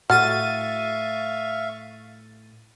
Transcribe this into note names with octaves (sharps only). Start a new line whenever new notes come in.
A2 F#4 E5 F5 C#6 F6 A6 D#7